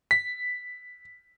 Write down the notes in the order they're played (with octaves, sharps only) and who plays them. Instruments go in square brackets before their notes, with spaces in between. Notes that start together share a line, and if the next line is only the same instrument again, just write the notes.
[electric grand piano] B6